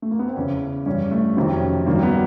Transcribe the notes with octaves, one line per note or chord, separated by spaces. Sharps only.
A3
A#3
B3
C4
E2 C#3 E3 C#4
G2 E3 C#4
A3
F2 C3 D#3 F#3
C#4
G2 D#3 F#3 A#3
B3